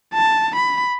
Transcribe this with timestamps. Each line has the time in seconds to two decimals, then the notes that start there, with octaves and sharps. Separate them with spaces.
0.14 A5
0.56 B5